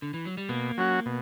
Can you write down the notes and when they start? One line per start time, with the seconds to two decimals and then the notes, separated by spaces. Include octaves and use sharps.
0.02 D3
0.14 E3
0.25 F#3
0.37 G3
0.49 B2 A#3
0.78 F#3 C#4 F#4
1.06 B2